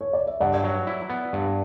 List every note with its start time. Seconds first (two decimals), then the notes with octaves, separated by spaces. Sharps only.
0.01 C#5
0.13 D5
0.27 E5
0.40 G2 D5 F#5
0.64 F#3
0.87 E4
1.10 B3
1.33 G2